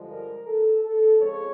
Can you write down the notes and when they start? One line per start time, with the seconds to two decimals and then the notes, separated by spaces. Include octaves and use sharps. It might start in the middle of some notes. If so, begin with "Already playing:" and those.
Already playing: G2 D3 F3 G#3
0.12 A#4
0.47 A4
0.84 A4
1.20 C#3 F3 G#3 C4 C#5